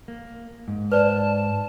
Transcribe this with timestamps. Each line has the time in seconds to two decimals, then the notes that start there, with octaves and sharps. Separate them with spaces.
0.08 A#3
0.68 G#2
0.92 B4 C5 D5 A5